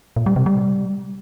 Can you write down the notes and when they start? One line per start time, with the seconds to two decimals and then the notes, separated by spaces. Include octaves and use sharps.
0.16 A#2
0.26 G3
0.36 C3
0.46 G3